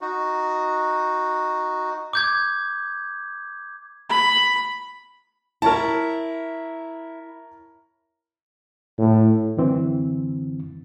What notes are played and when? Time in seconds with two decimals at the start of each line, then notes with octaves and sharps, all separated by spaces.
0.01 D#4 F#4
2.13 D6 G6 G#6
4.09 B5
5.62 E4 A#4 C#5 A5
8.98 A2
9.57 F#2 D3 E3 C4